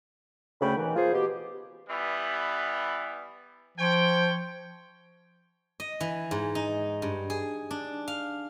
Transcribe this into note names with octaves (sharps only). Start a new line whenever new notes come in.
D2 C#3 A3 G5 B5
B2 D#3 E3
A#3 F4 G#4 C5
B2 G4
E3 G3 B3
F3 C#5 G5
D#5
E3
G#2
D#4
G2
G#4
D4
F5